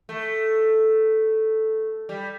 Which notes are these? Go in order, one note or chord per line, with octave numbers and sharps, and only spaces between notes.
A3
G3